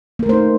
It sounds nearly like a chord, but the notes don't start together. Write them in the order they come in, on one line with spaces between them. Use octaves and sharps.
A#3 A#4 A3 C5 D#4